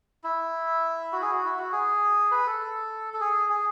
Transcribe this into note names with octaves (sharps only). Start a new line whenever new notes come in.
E4
F#4
G#4
F#4
E4
F#4
G#4
B4
A4
A4
G#4
G#4